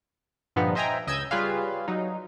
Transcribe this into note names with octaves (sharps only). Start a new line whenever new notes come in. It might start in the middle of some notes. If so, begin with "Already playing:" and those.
G2 A#2 D3 F3 B3 D#4
C5 D#5 E5 G5 G#5 A#5
C#2 D#5 E6 G6 G#6
G3 F4 G#4 B4 C#5 F5
F#3 D#4